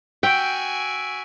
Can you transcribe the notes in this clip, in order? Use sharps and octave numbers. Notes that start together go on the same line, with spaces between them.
F#4 G5 G#5 E6 B6 D7